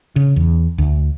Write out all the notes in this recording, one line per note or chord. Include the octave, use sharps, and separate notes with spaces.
C#3
E2
D2